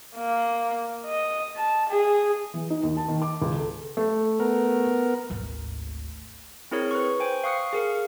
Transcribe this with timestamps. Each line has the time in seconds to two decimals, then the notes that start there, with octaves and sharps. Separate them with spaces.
0.16 A#3
1.06 D#5
1.57 A5
1.90 G#4
2.54 E3
2.70 D#4
2.83 D#2
2.97 A5
3.08 D#3
3.22 D6
3.42 C#2
3.56 A4
3.97 A3
4.40 B3 A#4
5.30 G#1 D2
6.71 C4 E4 G#4 A#4 C#5
6.91 B4 C#6
7.20 C5 G5 G#5
7.44 F5 C#6 D#6 F#6 C7 C#7
7.73 G#4 A#4 F5